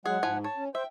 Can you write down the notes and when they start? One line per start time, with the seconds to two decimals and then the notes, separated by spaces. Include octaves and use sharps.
0.06 F#3 G#3 G#4 F#5
0.23 G#2 F3 E4 G#5
0.44 C#5 A5
0.57 C#4
0.75 C5 E5 G5